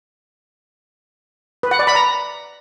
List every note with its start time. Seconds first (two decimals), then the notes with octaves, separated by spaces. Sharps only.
1.63 B4
1.71 F#5
1.79 D5
1.87 B5
1.95 A#5